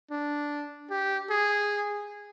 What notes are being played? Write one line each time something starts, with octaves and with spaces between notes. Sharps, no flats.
D4
G4
G#4